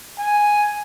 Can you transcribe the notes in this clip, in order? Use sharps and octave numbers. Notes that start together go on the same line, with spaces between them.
G#5